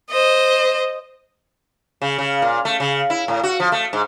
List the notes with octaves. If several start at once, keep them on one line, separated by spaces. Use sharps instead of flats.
C5 D#5
C#3
C#3
A#2
A3
C#3
E4
A2
F#4
F3
A3
G#2